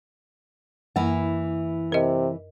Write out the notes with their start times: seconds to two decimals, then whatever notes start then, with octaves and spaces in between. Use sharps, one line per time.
0.96 F#2 E3 A#3 E4
1.92 C3 A#4 D#5